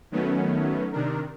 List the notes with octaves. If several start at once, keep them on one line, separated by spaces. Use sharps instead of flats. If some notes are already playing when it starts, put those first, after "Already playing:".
D#3 F#3 A3 B3 C#4
C3 D#3 D4 A#4